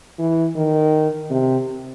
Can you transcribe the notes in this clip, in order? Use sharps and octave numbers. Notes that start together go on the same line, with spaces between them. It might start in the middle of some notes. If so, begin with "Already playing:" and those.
E3
D#3
C3